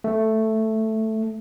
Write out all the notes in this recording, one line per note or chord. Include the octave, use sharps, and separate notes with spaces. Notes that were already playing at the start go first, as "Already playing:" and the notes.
A3